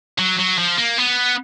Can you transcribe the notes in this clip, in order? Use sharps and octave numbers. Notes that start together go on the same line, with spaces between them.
F#3
F#3
F3
A#3
B3